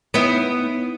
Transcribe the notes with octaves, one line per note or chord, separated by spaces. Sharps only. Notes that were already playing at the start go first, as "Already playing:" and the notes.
B3 D#4 E4